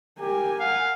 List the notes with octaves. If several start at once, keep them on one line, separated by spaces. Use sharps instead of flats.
G4 A#4 G#5
F5 F#5